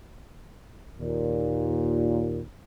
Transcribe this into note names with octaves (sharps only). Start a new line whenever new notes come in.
D#2 A#2